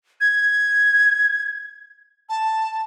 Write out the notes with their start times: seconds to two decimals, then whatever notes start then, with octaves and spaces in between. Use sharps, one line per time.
0.21 G#6
2.29 A5